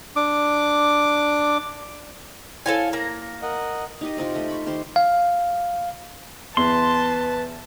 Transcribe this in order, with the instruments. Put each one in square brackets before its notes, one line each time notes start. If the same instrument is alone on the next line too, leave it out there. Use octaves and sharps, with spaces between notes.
[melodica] D4 D6
[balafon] E4 C5 C#5 [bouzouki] A4 F5 G#5
[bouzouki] A#3 A#5
[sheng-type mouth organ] A#4 D#5 F#5
[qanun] D#4 G4 D#5
C3 C4 D#4 F4
A3 D#5
B5 C#6
D#3 G4 C5 C6
[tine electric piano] F5
[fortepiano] E2 [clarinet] B4 [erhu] A5 [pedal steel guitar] C6